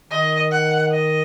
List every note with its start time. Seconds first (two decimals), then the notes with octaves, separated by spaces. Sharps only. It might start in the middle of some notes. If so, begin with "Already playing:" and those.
0.10 D#3 D#5
0.51 F#5
0.92 D#5